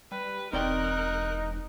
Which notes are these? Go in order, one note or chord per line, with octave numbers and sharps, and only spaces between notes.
G3 B4
E1 C4 D#4 A#4 D5 G5 F#6